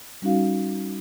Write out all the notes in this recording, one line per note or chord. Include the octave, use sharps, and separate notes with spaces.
G3 C#4 D#4 F#4 F5